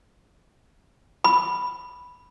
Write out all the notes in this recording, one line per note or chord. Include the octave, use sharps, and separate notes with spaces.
B5